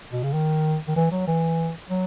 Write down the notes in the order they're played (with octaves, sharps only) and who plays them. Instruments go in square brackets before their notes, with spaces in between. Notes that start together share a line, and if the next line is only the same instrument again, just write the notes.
[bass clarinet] B2
C#3
D#3
D#3
E3
F#3
E3
F#3